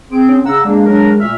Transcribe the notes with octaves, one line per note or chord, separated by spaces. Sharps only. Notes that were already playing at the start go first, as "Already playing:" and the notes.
C4 G#4 D7
C#4
C#3 F#5 A#5 E6
G#3 A#3 D4
F#3 D4 A#4
A#2 A3 E5 F6